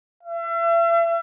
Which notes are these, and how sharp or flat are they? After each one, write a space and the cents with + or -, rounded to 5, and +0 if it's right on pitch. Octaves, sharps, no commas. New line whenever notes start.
E5 +40